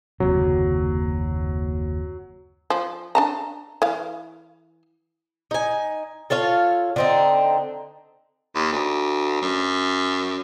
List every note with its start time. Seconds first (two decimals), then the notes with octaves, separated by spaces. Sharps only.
0.20 F#1 D#2 C3 F#3
2.70 F3
3.15 D4 A5 A#5
3.82 E3 F5
5.51 D#4 G#5
6.30 F4 A4 C#5 F5
6.96 D3 C4 D#4
8.55 D#2
8.72 D2
9.42 F#2